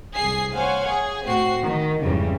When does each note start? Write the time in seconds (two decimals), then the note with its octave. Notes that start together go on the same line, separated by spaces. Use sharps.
0.15 C2 G#4 C7
0.54 C5 C#5 F5 F#5 G#5
0.87 G#4
1.27 A2 C4 F#4 C7
1.62 D#3
2.02 F2 G#2 C#3 E3 G3